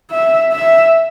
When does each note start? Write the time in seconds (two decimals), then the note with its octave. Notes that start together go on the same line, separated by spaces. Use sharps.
0.11 E5
0.53 E5